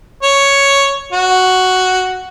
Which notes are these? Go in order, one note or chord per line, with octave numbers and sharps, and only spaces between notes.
C#5
F#4